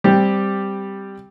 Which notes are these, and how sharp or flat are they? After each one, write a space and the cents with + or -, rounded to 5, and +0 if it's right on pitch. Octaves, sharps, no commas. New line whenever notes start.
G3 +0 C4 -10 G4 +0